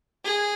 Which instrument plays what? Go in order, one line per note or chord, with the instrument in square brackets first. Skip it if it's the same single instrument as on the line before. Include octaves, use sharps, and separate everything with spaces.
[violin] G#4